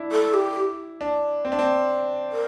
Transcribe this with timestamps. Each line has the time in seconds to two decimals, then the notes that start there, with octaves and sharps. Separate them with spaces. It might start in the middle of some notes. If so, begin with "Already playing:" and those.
Already playing: D4 E4
0.12 A4
0.34 G4
1.01 D4
1.45 C4
1.52 D4
1.59 C4
2.32 A#4